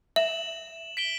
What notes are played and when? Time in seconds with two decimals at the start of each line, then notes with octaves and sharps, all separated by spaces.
0.16 E5 E7 F#7
0.97 B6 D7 G7